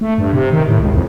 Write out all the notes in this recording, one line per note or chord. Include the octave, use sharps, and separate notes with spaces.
A3
G2
C3
D#3
A2
C#2
F2